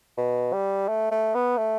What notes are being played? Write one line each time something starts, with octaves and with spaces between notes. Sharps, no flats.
B2
G3
A3
A3
B3
A3